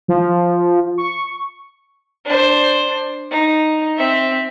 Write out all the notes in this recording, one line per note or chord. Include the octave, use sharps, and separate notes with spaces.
F3
C#6
D4 C5
D#4
C4 E5